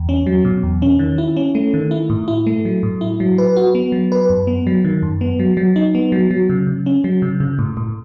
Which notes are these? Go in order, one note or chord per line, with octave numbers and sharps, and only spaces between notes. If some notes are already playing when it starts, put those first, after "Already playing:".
Already playing: E2
C#4
F#3
B2
E2
C#4
D#3
E4
C#4
A3
D#3
E4
A2
E4
A3
F#3
A2
E4
F#3
B4
F#4
B3
F#3
B4
F#2
B3
F#3
D#3
F#2
B3
F#3
F#3
D#4
B3
F#3
F#3
C#3
C#3
C#4
F#3
C#3
C#3
A2
A2